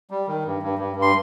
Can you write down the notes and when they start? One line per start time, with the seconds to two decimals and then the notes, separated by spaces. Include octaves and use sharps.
0.10 G3
0.28 D#3
0.45 G2
0.63 G2
0.79 G2
0.96 G2
1.02 C6